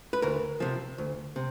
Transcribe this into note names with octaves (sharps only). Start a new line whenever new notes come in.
B4
D2 A#4
C3 F3
D2
C3